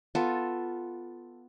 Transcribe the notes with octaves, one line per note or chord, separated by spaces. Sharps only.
B3 F4 A4